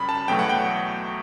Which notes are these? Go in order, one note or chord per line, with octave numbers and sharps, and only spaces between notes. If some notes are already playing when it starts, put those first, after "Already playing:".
Already playing: F#2 C#3 G3 B5
A5
E2 B2 F#3 A3 G5
F#5
G5